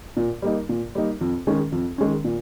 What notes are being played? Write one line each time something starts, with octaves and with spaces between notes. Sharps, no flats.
A#2
G3 A#3 D#4
A#2
G3 A#3 D#4
F2
D#3 G#3 C#4
F2
D#3 G#3 C#4
A#2